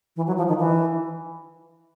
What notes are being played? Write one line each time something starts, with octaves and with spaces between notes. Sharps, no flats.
E3
F#3
F3
D#3
E3